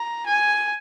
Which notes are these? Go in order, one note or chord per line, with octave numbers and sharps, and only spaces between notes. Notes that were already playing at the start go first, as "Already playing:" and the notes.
Already playing: A#5
G#5